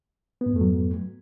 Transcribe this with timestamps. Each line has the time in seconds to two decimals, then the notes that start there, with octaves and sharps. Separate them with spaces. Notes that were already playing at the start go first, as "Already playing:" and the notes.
0.41 B3
0.46 G#2
0.51 F2
0.56 A3
0.61 F#3